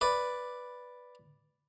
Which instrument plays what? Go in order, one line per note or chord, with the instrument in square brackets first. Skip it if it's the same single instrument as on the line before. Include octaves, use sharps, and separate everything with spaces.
[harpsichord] B4 D5